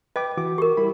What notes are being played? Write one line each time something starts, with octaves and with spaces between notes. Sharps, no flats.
B4 D#5 G5 D6
E3 F#4 D6
G4 A#4
G3 E4 B5